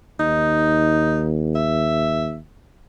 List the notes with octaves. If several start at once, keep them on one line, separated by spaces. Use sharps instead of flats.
D#2 D#4
E5